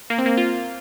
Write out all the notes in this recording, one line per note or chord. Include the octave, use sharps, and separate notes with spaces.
A#3
C4
A#3
F4